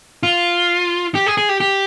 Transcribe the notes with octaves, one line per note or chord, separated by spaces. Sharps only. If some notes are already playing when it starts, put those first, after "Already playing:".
F4
G4
G#4
G#4
G4
G4